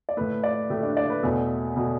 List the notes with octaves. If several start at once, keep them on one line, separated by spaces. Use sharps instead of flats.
D5
A2 A3 B4
D5
A2 A3 G4
D4
D5
B4
E2 B2 A3
B2 A3